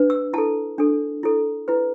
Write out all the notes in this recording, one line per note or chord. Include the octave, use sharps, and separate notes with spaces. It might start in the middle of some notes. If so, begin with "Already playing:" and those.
Already playing: D4 B4
E6
E4 A4 A5
D4 A4
E4 A4
E4 B4